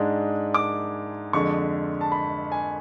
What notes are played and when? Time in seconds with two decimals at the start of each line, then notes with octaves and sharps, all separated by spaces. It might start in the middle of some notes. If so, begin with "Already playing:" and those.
Already playing: G#2 G#3 D4
0.54 D6
1.33 F2 D3 G#3 C#6
2.01 A5
2.12 B5
2.52 G#5